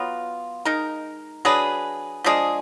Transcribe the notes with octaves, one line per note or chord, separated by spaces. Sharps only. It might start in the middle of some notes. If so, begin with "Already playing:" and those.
Already playing: F#3 B3 F4
G#3 D#4 A#4
F#3 D4 G#4 B4
F3 G#3 D4 G#4